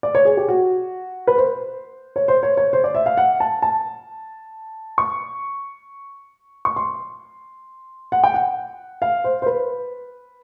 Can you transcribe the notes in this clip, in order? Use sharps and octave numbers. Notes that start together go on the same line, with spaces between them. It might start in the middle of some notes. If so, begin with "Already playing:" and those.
D5
C#5
G#4
G4
F#4
B4
C5
C#5
C5
C#5
C#5
C5
D5
E5
F5
F#5
A5
A5
C#6
C#6
C6
F#5
G5
F#5
F5
C5
C5
B4